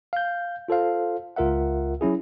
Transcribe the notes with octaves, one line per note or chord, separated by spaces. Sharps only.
F5 G6
F4 A4 C5 F5
C#2 F4 A#4 E5 F#5
F#3 C#4 E4 G#4